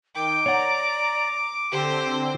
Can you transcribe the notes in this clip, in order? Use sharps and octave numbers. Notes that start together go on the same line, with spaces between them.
D#3 G5 D6 G6
C#5 D5 F#5 A#5
D3 C4 G4 C5 G5